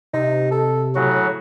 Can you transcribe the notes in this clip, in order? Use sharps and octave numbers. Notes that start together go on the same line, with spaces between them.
C3 D#4
A4
A2 C#3 F#3 F#4